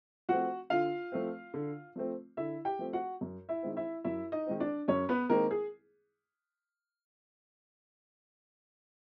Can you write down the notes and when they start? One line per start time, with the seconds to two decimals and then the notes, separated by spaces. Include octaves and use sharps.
0.29 F3 A3 C4 F#4 F#5
0.70 D3 F4 F5
1.12 F3 A3 C4
1.54 D3
1.96 F3 A3 C4
2.37 D3 E4 E5
2.65 G4 G5
2.79 F3 A3 C4
2.93 F#4 F#5
3.21 F#2
3.49 E4 E5
3.63 D#3 G#3 C4
3.77 E4 E5
4.04 F#2 E4 E5
4.32 D#4 D#5
4.46 D#3 G#3 C4
4.60 D4 D5
4.88 F#2 C#4 C#5
5.09 B3 B4
5.29 D#3 G#3 A#3 C4 A#4
5.51 G#4